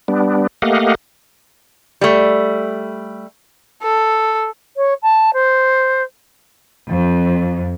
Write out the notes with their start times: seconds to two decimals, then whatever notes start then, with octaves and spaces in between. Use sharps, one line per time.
0.08 G3 B3 D4
0.62 A3 A#3 G4 D#5 F5 F#5
2.01 G3 A3
3.83 A4
4.77 C#5
5.03 A5
5.34 C5
6.90 F2